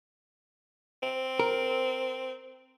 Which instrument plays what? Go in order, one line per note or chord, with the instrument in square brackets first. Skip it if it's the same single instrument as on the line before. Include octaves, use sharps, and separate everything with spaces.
[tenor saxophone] C4
[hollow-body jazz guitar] A#4